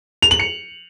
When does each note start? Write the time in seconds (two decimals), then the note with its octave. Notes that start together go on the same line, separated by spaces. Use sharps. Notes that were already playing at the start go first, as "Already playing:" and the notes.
0.22 F7
0.31 F#7
0.39 C#7